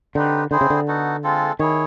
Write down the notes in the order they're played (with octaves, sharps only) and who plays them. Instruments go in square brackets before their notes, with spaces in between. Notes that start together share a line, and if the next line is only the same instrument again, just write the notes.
[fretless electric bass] D3 [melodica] C4 D#4 G4 B4
[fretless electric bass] D3 [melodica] C4 E4 G#4 C5
[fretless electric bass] C#3
D3
[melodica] B3 D#4 F#4 A4
G#3 C4 F4 A4
[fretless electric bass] D#3 [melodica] E4 G#4 C#5